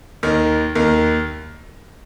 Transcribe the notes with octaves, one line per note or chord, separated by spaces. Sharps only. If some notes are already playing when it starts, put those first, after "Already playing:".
D#2 D#3
D#2 D#3